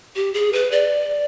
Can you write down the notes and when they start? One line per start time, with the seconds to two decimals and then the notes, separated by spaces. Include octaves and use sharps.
0.16 G4
0.34 G#4
0.53 B4
0.71 D5